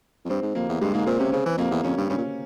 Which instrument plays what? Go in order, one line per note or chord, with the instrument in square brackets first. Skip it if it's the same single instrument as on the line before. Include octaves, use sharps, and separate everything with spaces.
[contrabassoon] F2
[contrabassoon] G2 [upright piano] C4
[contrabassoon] G#2
[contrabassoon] F2 [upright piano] A#3
[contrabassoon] E2
[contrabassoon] G2 [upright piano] G#3
[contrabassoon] G#2 [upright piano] A#3
[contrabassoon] A#2 [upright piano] C4
[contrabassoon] C3 [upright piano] C#4
[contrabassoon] C#3 [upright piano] C4
[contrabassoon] E3
[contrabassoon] F2 [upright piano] A#3
[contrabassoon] E2
[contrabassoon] F2 [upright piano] C#4
[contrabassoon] G2
[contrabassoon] G2 [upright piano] C#4
[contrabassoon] A#2